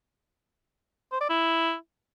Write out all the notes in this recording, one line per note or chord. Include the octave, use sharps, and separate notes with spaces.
C5
D5
E4